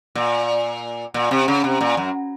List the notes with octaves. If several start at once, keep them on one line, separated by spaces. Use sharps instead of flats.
A#2
A#2
C3
C#3
C3
A#2
F#2